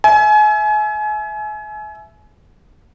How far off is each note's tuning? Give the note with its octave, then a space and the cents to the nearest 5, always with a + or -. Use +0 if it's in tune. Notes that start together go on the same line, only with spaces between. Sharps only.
E5 +5 G#5 +35